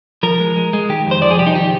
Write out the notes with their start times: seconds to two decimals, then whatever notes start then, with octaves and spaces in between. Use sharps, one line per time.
0.23 F3 A#4
0.40 G#3
0.56 G#3
0.73 G#3
0.89 D#3 G4
1.06 F2
1.11 C5
1.22 F3 D5
1.31 G#4
1.38 C2 G4
1.47 D#4
1.55 D#3 G4